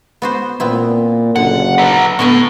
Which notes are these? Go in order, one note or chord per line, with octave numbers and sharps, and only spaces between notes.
B3 F#4 C5
A#2 B3 C4 E4
F#1 D3 F#5
F#3 B4
A2 D3 B3 F#4 G#5